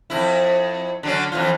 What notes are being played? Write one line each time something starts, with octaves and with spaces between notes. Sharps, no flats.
F2 E4
D3 F#3 C#4
F2 E3 F4